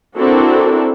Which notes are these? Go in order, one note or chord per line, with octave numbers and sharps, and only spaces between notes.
C4 D4 E4 F#4 A4 A#4